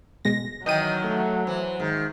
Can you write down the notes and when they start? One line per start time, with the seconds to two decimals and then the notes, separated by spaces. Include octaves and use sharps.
0.25 B2 G#3 A#6
0.66 D#3 E3 F#3 D#5 G5 D#7
1.04 A3
1.47 E3 C5
1.80 G#2 D#3